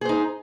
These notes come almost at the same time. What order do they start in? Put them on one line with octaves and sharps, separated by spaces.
G#4 C5 D#4